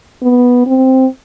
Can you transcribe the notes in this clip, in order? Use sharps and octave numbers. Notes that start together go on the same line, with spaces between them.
B3
C4